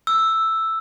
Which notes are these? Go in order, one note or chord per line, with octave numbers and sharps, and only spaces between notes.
E6